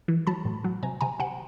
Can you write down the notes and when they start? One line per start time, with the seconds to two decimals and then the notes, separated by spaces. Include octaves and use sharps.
0.08 E3
0.27 F#3 A5 B5
0.45 A2
0.64 F#3
0.83 C3 G#5 A#5
1.01 C3 G#5 A#5
1.19 C3 F#5 G#5